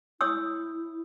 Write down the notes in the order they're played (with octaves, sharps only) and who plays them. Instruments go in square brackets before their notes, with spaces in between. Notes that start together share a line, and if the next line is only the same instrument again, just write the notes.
[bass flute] E4 [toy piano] C#5 D#6 E6